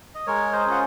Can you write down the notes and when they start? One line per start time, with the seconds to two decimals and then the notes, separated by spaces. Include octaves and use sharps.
0.15 D#5
0.27 G#3 A#4 C#5
0.52 C5 D#5
0.66 C#4 F4 F#5